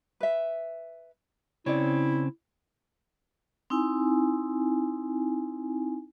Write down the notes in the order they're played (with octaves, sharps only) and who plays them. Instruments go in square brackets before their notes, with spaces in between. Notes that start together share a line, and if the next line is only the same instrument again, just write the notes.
[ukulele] B4 E5
[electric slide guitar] C#3 C4 [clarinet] E4 [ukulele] C#5 D5
[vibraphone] C4 D#4 E4 G#5